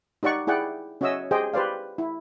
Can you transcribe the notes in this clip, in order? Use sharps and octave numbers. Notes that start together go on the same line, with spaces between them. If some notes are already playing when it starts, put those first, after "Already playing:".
D#4 G4 D5 F#5 C#6
E4 G#4 D5 F#5 G5
C#4 F#4 C#5 D#5 E5 E6
G4 G#4 C5 D#5 G5
G4 B4 C5 D5 F5
E4